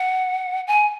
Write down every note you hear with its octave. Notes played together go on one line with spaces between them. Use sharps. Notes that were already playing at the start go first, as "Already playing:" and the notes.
Already playing: F#5
G#5